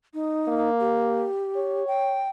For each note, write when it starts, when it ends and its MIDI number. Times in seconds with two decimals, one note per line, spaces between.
0.14 0.70 63
0.48 1.26 58
0.80 1.86 67
1.56 2.25 73
1.87 2.29 79